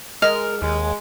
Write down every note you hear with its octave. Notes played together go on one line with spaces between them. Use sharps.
G#3 A#4 D#5 F6
D#2 G#3